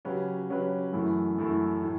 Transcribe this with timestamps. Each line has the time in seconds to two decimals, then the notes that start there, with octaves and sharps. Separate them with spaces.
0.05 C#3 F#3 C#4 G4 B4
0.49 C#3 F#3 C#4 G4 B4
0.93 F#2 E3 A3 E4
1.38 F#2 E3 A3 E4
1.83 A2